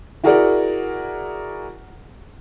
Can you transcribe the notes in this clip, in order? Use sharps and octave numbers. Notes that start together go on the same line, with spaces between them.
E4 F#4 G#4 A#4 D5 F#5